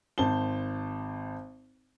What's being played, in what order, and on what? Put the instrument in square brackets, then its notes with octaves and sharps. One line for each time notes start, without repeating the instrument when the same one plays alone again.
[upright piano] G#1 C5 A5 G7